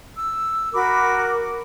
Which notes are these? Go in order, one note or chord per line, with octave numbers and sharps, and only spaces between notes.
E6
F#4 A#4 B5 D6